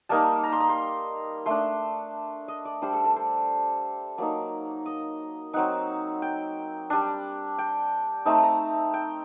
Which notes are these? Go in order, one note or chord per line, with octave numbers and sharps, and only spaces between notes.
G3 A#3 D#4 A5
A#5
C6
A#5
C6
A3 D4 C6
D#5
D5
G3 D4 C5
A4
A4
C5
F#3 A#3 D#4 D5
D#5
F#3 C4 D#4 F#5
G5
G3 D4
G5
A3 C4 D#4 A5
A#5
G5